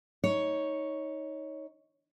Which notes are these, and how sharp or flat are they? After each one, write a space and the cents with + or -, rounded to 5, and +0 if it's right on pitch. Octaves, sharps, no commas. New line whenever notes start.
D#4 +15 C#5 +0